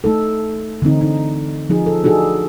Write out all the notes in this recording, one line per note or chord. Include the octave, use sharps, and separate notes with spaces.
A3 D#4 A4
D3 E3 C4 D#4
D#4
F3 D#4 G#4
A4
D4 D#4 F#4 G#4 A4